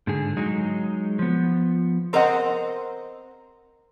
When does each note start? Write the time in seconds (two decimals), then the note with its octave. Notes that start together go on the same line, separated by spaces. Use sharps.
0.07 G#2 D3 G#4
0.37 F#3 G#3 D#4
1.19 F3 B3
2.13 C4 A#4 C5 D#5 F#5